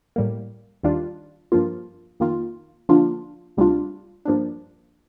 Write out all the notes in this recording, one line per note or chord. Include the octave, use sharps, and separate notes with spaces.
A2 G3 A#3
D#2 D#3 G3 D4 F4
G2 F3 A#3 F4
F2 D#3 A#3 F4
D3 F3 A#3 D4 F4
D2 C3 G3 D4 F4
G2 F3 A#3 D4